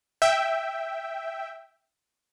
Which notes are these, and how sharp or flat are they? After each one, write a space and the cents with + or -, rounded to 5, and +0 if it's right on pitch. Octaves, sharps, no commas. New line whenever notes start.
E5 +0 G5 +0